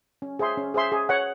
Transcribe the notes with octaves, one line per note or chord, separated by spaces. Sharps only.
C#4
G#4 C5 E5 C6
C#4
G#4 C5 E5 C6
G#4
C#5 F#5